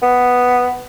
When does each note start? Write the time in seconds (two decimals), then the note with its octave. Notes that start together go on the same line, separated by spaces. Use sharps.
0.02 B3